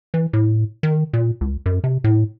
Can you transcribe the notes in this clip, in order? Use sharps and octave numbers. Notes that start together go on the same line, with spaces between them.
E3
A2
D#3
A#2
C#2
F#2
C3
A2